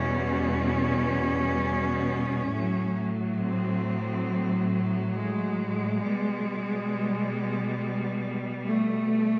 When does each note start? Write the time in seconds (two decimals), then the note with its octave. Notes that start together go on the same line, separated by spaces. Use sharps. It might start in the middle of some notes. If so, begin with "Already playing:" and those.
Already playing: E2 B2 G3 C#4
2.50 A2 F#3
3.38 C4
5.14 G#3
6.02 B2 G3
8.68 A3